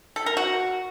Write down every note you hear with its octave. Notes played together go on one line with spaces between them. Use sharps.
A4
A#4
F#4